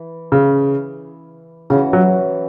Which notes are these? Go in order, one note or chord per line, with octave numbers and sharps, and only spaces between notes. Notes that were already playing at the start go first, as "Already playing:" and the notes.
Already playing: E3
C#3
C#3 E3 C#4 F#4
F#3